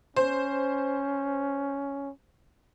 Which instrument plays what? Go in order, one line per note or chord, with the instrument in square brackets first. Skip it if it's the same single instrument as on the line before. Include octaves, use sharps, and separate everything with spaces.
[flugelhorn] C#4 [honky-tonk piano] C5